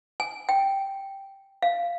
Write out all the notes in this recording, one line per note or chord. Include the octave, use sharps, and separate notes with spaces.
G#5
G5
F5